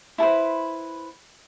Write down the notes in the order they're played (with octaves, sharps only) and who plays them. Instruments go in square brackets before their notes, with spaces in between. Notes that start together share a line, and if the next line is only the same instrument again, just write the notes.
[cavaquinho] E4 A4 B4 C5